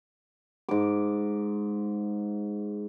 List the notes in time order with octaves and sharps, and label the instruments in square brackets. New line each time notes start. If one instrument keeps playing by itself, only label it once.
[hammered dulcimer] G#2 D6